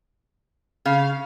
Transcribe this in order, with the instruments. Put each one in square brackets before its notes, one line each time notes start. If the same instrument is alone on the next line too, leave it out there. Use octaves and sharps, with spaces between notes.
[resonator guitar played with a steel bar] C#3 [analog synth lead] F5